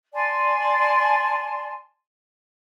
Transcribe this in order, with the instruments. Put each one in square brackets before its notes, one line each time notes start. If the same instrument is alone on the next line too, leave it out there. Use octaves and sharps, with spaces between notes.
[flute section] D5 G#5 A5 C6